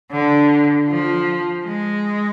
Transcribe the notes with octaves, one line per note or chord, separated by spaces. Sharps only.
D3
F3
G#3